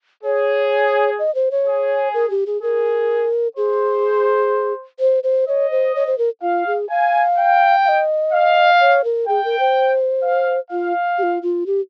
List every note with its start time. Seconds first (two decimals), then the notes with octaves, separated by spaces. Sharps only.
0.24 G#4 C#5
1.19 D#5
1.35 C5
1.51 C#5
1.67 G#4
2.14 A#4
2.30 G4
2.47 G#4
2.62 G#4 A#4
3.57 G#4 C5
5.00 C5
5.23 C5
5.48 C#5 D#5
5.71 C5
5.96 C#5
6.07 C5
6.18 A#4
6.42 F4 F5
6.67 G#4
6.90 F5 G#5
7.38 G5
7.85 F5
7.89 D#5
8.33 F5
8.80 C#5
9.04 A#4
9.28 G#4 G5
9.45 A#4
9.60 C5
10.23 F5
10.71 F4 F5
11.18 G4
11.23 F4
11.42 F4
11.66 G4